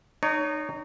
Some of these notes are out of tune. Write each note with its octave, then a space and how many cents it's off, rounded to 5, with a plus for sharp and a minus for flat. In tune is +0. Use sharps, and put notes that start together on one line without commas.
D#4 -25 C#5 +25